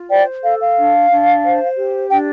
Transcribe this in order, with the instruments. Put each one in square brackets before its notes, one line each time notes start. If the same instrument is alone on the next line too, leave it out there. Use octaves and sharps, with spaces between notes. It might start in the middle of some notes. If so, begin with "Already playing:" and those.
Already playing: [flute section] F4
C5 D5 G5
A4 F5
F5
D4
D4
C5
G4
D4 G5